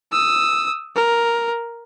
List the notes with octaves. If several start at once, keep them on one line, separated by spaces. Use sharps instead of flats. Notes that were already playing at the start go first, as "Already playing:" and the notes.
D#6 E6
A#4